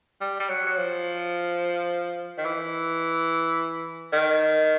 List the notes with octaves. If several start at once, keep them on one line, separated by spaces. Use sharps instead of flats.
G3
G3
F#3
F#3
F3
D#3
E3
D#3